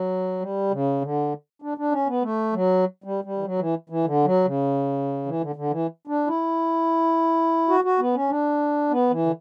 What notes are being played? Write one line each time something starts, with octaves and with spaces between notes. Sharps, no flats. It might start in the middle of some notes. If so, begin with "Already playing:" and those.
Already playing: F#3
G3
C#3
D3
D4
D4
C#4
B3
A3
F#3
G3
G3
E3
F#3
E3
E3
D3
F#3
C#3
E3
D3
D3
E3
D4
E4
F#4
F#4
B3
C#4
D4
B3
E3
D3